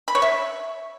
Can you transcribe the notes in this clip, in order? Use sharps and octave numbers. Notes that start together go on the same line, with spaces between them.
B5
C#5
E5